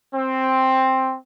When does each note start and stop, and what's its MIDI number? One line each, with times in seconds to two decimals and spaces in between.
0.15 1.16 60